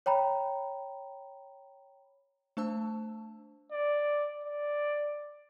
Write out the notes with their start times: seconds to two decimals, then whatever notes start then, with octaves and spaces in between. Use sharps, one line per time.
0.06 C#5 G5 A#5 B5
2.57 A3 D4 C5 A5 E6
3.71 D5
4.44 D5